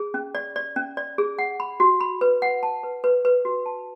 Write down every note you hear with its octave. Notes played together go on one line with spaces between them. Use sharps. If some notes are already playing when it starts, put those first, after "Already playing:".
Already playing: G#4
C#4
D5
D5
C#4
D5
G#4
F#5
B5
F#4
B5
B4
F#5
A5
B4
B4
B4
F#4
A5